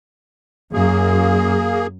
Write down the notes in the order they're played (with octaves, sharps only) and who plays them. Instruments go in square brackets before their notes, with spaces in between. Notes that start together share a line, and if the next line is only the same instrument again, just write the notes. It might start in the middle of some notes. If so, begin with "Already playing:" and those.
[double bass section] F#2 [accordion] A#3 G#4